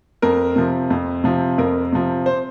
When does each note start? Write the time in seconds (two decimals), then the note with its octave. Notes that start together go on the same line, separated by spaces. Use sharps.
0.22 F2 A#4
0.56 C3 F3
0.90 F2
1.24 C3 F3
1.58 F2 A#4
1.93 C3 F3
2.26 C5